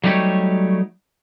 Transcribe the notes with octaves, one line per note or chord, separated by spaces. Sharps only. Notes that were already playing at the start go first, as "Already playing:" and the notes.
F#3 G3 A3 D#4 G4 C#5